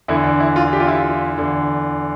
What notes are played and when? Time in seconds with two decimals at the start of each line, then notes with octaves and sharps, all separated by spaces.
0.08 E2 D3 E4
0.24 D4
0.40 E4
0.56 F4
0.73 G4
0.80 F4
0.87 E4
0.95 F4
1.38 E2 D3